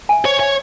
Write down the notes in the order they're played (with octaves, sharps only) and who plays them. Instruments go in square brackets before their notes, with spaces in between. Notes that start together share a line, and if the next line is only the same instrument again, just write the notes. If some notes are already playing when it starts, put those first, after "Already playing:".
[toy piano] E5 G#5
[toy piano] C5 [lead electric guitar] C#5
[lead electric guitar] C#5 [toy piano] E5 G#5